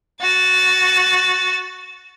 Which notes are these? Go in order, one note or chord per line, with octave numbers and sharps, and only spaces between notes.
F#4 A6